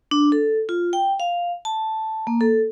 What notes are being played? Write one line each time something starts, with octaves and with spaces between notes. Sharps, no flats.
D4
A4
F4
G5
F5
A5
A#3
A4